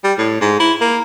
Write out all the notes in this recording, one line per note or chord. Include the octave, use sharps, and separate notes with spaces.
G3
A2
G#2
E4
A#3